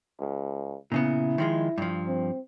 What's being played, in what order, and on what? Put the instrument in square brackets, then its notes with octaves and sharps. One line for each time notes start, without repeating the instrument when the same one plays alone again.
[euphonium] C#2
[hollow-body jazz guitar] A#2 C#3 B3 [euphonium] E4
[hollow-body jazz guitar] D#3 F3 G#3
G2 F3
[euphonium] C4